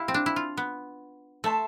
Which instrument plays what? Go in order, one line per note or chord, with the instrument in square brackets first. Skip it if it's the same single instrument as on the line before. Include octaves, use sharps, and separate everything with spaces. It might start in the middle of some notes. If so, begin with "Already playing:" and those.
Already playing: [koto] E4 [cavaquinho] G4 F5 C6
[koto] C4
D4
E4
F4
B3
[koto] A3 [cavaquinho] A4 E5 A5 C6